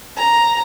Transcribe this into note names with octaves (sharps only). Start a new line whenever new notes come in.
A#5